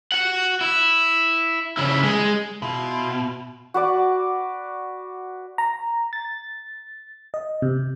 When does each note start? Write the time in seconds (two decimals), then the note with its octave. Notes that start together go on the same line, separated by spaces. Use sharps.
0.12 F#4 F#5
0.61 E4
1.78 C#3 E4
2.03 G#3 G#4
2.62 B2 E4 F4 C6
3.74 F#4 B4 D5
5.58 A#5
6.13 A6
7.34 D#5
7.62 C3